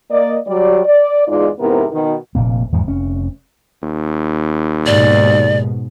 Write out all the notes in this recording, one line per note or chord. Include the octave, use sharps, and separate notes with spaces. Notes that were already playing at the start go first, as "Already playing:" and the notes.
A#3 D5 D#5
F#3 G3 D5
D5
E2 G#2 G#3 D#4 F4 D5
F2 G#2 C3 B3 E4 A#4
B2 D#3
F1 A#2 A#3
E2 G#2 E3 F3
F1 C#4
D#2
G#2 B2 D5